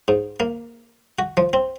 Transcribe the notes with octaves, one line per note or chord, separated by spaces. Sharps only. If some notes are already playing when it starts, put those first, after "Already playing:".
G#2
A#3
F#4
F3
C4